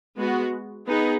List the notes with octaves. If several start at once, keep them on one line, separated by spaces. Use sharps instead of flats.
G#3 B3 F#4
B3 D#4 G#4 B4